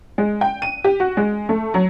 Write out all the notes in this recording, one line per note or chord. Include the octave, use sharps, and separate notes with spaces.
G#3
G5
D#7
G4
F#4
G#3
A3
F#3